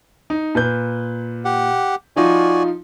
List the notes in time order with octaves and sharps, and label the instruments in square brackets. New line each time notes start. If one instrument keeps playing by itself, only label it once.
[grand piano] D#4
A#2 B4 G6
[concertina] G4 F#5
[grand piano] F3 D#4 F4 [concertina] F#4 D5 G#5